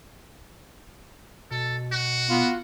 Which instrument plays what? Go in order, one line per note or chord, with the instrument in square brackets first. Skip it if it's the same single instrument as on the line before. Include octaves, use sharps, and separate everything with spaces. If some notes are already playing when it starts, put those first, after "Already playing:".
[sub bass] B2 [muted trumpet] A4
[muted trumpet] F#4
[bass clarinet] B3 [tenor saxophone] F4